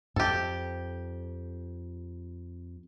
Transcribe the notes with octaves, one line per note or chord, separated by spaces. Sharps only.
F2 G4 A4